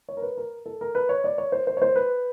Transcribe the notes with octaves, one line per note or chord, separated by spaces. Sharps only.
C#5
A#4
B4
A#4
A4
A#4
B4
C#5
D5
C#5
C5
C5
C#5
C5
B4